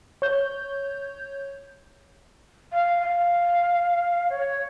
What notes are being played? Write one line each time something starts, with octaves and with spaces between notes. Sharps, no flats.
C#5 G6
F5
F5
C#5